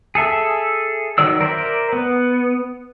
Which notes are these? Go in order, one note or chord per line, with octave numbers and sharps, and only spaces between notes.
G#4 A4 E5
D#3 F#3 D5 E6
A#4 C5 D5 E5
B3